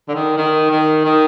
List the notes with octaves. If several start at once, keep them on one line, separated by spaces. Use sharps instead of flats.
D3
D#3
D#3
D#3
D#3